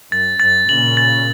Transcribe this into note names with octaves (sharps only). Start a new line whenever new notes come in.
F#2 A6
F#2 A6
A#2 C#3 F#7
A6